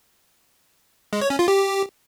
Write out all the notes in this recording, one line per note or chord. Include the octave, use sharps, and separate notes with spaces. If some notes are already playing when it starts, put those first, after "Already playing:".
G#3
C#5
C#4
F4
G4